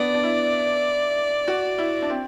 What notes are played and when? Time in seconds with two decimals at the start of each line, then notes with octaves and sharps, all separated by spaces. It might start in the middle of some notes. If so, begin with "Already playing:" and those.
Already playing: B3 D4 D5
0.14 D4
0.23 E4
1.48 F#4
1.78 E4
2.02 D4
2.10 C4